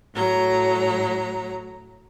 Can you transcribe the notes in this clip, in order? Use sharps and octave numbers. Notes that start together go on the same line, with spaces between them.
A2 F#3 A#5